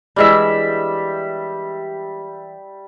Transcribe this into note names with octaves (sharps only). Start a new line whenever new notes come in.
E3 G3 G#3 D4 E5